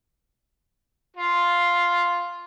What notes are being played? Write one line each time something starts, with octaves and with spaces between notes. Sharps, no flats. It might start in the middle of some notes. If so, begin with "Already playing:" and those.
F4